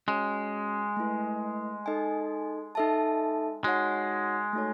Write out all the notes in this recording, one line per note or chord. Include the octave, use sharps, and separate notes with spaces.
G#3 C#4 F#4 C#5
A3 E4 B4
D#4 A4 D#5 G#5
D#4 A4 E5 A5
G#3 D#4 F#4 C#5 F#5
A3 D#4 F#4 A4 C#5